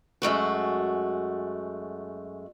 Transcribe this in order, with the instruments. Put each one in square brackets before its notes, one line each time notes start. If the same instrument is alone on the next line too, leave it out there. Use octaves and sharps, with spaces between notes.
[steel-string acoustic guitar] F#2 G#3 A3 F#4